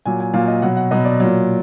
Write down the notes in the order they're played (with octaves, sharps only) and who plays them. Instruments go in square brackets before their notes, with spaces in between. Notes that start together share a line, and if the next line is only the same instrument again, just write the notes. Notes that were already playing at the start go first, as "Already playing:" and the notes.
[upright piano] A#2 F#3 G#5
G#5
A#2 F#3 F5
D#5
B2 F#3 F#5
F#5
B2 F#3 D#5
D5
A#2 F#3